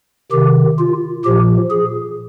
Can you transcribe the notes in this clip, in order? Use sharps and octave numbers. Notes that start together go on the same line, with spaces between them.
C3 D#3 G4
F4
A#2 F3 G4
G#4